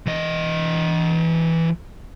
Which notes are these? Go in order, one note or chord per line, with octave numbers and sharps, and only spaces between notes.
E3 D#5